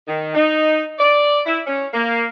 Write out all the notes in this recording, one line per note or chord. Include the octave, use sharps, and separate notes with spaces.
D#3
D#4
D5
E4
C#4
A#3